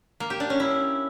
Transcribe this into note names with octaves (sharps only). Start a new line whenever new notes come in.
A#3
G4
D4
C#4
E4